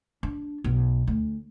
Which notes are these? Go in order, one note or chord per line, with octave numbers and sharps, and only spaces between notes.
D4
B1
D2